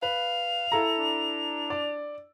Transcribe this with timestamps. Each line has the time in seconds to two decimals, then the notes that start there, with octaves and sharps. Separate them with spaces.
0.03 B4 F5 F7
0.72 E4 A4 A#5
0.98 D4
1.70 D5